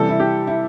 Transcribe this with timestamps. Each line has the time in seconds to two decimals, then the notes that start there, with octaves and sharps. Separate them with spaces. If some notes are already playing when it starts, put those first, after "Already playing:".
Already playing: C3 E3 G3 A4
0.09 E4
0.20 G4
0.47 E4